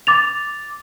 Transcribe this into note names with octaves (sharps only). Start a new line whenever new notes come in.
D6 A6 F7